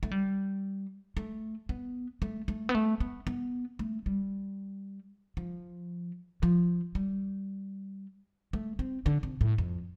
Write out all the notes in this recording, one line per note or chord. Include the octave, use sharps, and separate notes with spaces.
A3
G3
A3
B3
A3
A3
B3
A3
B3
B3
A3
G3
F3
F3
G3
A3
C4
D3
C3
A2
F2